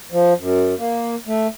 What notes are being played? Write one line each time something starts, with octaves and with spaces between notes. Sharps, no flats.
F3
F#2
A#3
A3